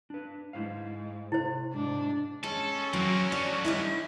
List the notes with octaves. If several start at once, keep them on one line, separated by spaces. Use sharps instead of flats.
D4 B4
G#2 E4 C5 F5
C3 E4 C5
G#2 D4
G#3 C#4 A4
F#3 A#3 C4
D3 F#3 D5
G3 D#4 E4